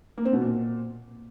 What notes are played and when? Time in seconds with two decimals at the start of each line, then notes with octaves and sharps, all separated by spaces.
0.18 A#3
0.25 C4
0.33 B2
0.41 A#2